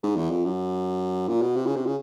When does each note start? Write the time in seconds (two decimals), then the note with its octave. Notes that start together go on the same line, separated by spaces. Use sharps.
0.03 G#2
0.17 E2
0.31 F2
0.45 F#2
1.28 A#2
1.42 B2
1.56 C3
1.67 C#3
1.76 C3
1.87 C#3